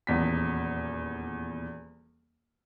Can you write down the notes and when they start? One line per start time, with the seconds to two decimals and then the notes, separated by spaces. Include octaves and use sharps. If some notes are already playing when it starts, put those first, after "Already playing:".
0.07 D#1 E2 B6